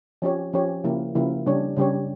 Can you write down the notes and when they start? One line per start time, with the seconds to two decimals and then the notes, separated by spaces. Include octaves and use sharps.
0.22 F3 C#4 G4 C#5
0.53 F3 C#4 G4 C#5
0.84 C#3 F3 A#3 E4 G4
1.15 C#3 F3 A#3 E4 G4
1.46 C#3 G3 D4 G4 C#5
1.76 C#3 G3 D4 G4 C#5